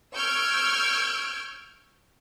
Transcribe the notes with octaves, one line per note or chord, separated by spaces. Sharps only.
C#6 E6 F6 G6 G#6 D7